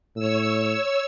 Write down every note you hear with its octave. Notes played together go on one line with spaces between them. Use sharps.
A2 C#5 E6